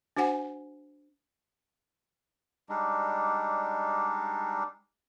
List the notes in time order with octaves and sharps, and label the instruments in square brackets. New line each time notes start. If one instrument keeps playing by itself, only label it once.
[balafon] D4 F#4 C5 F#5 G#5
[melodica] G3 G#3 D4 D#4